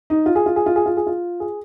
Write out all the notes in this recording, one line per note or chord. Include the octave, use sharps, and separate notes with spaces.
D#4
F4
G#4
F4
G#4
F4
G#4
F4
G#4
F4
G#4